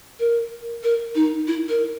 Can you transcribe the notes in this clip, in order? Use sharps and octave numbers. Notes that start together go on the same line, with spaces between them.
A#4
A#4
D#4
E4
A#4